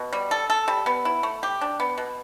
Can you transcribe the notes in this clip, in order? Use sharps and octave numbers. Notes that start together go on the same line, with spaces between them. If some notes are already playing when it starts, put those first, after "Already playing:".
Already playing: B2
G3
A4
A4
G3
B3
E4
A3
G4
D4
B3
B2